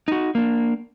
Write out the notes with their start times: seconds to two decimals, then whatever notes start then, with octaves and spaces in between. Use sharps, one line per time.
0.08 D#4 F#4
0.35 A#3 D4